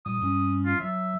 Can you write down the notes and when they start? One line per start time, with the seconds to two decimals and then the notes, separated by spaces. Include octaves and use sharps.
0.06 A#2 G3 D#6
0.21 G2 G3 C#4
0.66 F4
0.80 F#3 E5